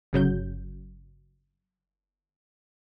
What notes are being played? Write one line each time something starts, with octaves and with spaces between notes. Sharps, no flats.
G1 C#3 F#3 G6